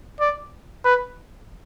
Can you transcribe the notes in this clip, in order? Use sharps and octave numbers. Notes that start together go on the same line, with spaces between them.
D5
B4